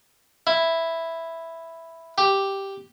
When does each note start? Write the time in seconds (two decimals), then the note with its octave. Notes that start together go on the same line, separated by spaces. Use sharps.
0.47 E4
2.18 G4